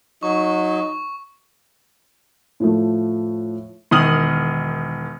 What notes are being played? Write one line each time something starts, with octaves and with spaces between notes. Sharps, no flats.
F#3 D#4 C#6
A2 F3 A3
E1 D#3 D#6 F6 F#7